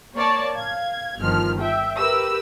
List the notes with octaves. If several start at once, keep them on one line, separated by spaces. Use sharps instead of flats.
A#3 C#5 D5 A5
F5 G#6
G1 D#3 F3 F6
E5 G5
G4 A#4 B4 E6